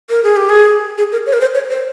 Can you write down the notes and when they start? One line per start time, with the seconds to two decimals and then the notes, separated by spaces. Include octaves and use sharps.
0.10 A#4
0.24 G#4
0.36 G4
0.49 G#4
0.98 G#4
1.12 A#4
1.27 C#5
1.33 A#4
1.41 C5
1.55 C#5
1.70 C5